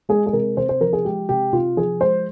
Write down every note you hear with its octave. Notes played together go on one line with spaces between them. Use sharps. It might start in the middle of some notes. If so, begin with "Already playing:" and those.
G#3 G#4
G#4
C3 A#4
C3 C5
C5
F3 A#4
G#4
G#3 G4
C3 G4
C3 F4
F3 G#4
G#3 C5